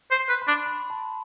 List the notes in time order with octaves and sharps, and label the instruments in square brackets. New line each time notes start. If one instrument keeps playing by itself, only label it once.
[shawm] C5
[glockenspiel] C6
[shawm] B4
[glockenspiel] B5
[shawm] D4
[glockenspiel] B5
A5